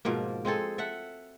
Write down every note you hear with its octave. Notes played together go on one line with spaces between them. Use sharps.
G#2 B2 F3 A#3
G#3 C4 G#4 A4
A4 E5 F#5